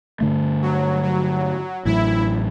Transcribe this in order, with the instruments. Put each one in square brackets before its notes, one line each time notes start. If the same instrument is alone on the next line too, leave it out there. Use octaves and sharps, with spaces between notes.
[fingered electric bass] G2 D3 A3
[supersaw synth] F#3
F#3
[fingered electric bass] A1 A2 F#3 [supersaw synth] E4